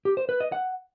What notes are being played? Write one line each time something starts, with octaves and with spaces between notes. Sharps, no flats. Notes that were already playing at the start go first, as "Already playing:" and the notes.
G4
C5
B4
D#5
F#5